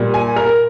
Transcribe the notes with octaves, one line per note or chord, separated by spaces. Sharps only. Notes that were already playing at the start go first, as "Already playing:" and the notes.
Already playing: A#2 G3
G#5
A#4